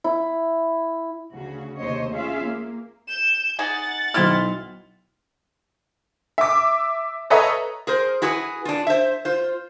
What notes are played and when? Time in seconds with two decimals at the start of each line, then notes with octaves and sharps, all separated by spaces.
0.04 E4
1.32 D2 C#3 F#4
1.78 D#2 C3 A3 C5 C#5 D#5
2.12 C#4 F4 G#4 E5 F5
2.43 A#3
3.07 G6 E7
3.59 D#4 G#4 F#5 A6
4.14 B1 C4 E4 C5 F6
6.38 E5 D6
7.30 A4 B4 C#5 D#5 E5 A#5
7.87 G#4 A#4 C5
8.22 E4 F#4 G#4 B4
8.65 D4 F4
8.87 C5 E5
9.25 F4 C5